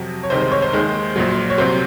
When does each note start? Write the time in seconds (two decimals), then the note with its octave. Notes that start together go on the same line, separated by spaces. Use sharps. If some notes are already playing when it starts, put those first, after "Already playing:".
Already playing: F2 C3 F#3
0.23 C#5
0.30 C2 C3 D#3 G#3 C5
0.41 C5
0.51 C#5
0.62 C5
0.73 D#2 D#3 G#3
1.16 A#1 A#2 F#3
1.50 C#5
1.58 C2 C3 F#3 C5